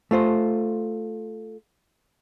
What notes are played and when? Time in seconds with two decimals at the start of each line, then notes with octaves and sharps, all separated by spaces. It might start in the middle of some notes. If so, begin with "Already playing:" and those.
0.11 A3 F4 C5